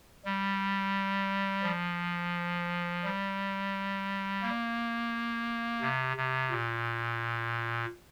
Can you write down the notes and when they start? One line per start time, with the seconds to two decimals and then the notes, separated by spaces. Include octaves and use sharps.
0.25 G3
1.63 F3
3.03 G3
4.42 A#3
5.81 C3
6.17 C3
6.51 A#2